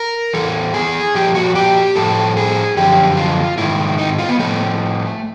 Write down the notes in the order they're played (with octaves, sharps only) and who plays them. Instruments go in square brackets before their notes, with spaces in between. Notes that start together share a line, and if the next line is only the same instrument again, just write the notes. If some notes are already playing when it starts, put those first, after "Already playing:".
Already playing: [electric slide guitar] A#4
E2 C3 E3 A4
G#4
A#2 F3 G4
F#4
G4
A2 F3 A4
G#4
F#2 D3 F3 G4
F4
G#2 D#3 E4
D#4
F4
B3
A2 F3 A3